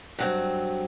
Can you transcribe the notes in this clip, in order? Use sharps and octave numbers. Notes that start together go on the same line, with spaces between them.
G2 F#3 C4